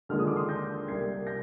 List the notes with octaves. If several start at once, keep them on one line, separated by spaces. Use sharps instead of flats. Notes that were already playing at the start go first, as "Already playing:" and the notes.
D#2 D3 F3 G#3 F6
D#6
D6
C6 D#6
G6 A#6
C2 C3 G3 A#3 G#6 C7
G6 A#6